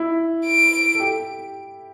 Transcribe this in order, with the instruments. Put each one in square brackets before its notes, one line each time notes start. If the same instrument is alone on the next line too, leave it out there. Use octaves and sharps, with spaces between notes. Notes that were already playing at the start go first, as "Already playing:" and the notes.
Already playing: [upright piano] E4
[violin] D7
[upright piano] A4
G4